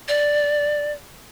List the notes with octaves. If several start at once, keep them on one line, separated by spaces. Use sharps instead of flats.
D5